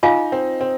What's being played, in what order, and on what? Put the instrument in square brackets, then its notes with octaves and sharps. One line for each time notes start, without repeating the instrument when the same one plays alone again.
[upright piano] D#4 [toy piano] F4 G#4 F5 G#5
[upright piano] C4
C4